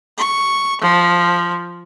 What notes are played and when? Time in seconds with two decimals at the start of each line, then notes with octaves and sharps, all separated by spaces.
0.18 C#6
0.81 F3